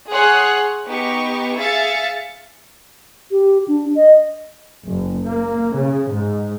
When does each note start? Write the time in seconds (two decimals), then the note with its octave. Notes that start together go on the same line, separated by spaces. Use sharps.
0.10 G#4 C#5 F#5 C6 F#6
0.85 B3 D#4 G4 C#6
1.57 G#4 E5 F5 A6 C#7
3.31 G4
3.68 D4
3.96 D#5
4.84 F#1
5.25 A#3
5.74 C#3
6.09 G#2